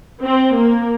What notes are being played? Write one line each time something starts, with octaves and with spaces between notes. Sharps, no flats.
C4
A#3